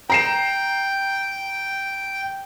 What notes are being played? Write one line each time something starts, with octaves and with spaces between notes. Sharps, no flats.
G5 A#5 C7 E7